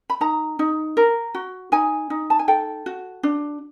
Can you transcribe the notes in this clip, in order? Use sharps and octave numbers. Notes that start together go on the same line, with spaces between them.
B5
D#4 A#5
D#4
A#4
F#4
D#4 G#5
D#4
A5
G#5
A4 G5
F#4
D4